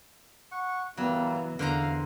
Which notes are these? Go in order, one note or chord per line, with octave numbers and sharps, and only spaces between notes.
F#5 C#6
E3 F#3 G3 A#3 B3
E2 D3 C5 F5 A#5